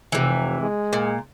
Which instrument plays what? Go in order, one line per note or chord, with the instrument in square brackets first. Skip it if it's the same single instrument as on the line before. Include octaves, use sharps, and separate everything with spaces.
[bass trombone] F1 [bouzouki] C3 E3
[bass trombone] G#3
[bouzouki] A#2